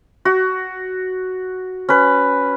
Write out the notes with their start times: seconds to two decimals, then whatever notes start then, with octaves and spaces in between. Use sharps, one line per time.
0.25 F#4
1.89 C#4 B4